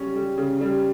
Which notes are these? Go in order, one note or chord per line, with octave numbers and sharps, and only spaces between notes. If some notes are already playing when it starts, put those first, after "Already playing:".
Already playing: C#3 G3 C#4
G3
C#3
G3